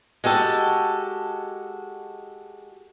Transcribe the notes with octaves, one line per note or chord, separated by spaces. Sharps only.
G#3 F#4 G4 A4